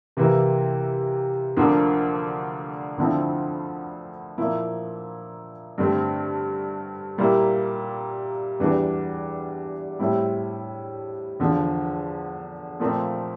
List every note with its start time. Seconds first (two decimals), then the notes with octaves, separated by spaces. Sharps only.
0.17 C3 E3 A#3 E4
1.57 D2 D3 F3 A#3 D4
2.98 D2 D3 F3 C4 E4
4.38 A#2 F3 A#3 E4
5.78 G2 D3 A3 C4
7.18 A#2 G3 A#3 E4
8.60 E2 E3 G3 D4
9.99 A2 G3 C4 E4
11.40 E2 D3 F3
12.79 A#2 F3 A3 C4